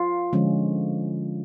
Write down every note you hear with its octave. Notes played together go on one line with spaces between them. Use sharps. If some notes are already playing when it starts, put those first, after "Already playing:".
Already playing: F4
D3 F3 G#3 C#4 F4